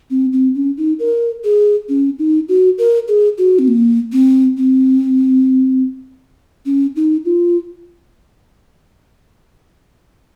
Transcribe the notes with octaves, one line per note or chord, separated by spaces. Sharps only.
C4
C4
C#4
D#4
A#4
G#4
C#4
D#4
F#4
A#4
G#4
F#4
C4
A#3
C4
C4
C#4
D#4
F4